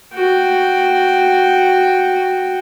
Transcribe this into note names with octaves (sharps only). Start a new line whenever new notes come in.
F#4 G5